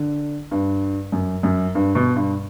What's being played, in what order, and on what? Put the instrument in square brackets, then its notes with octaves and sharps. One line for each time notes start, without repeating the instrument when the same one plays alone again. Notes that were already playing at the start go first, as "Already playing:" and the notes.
Already playing: [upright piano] D3
G2
F#2
F#2
G2
B2
G2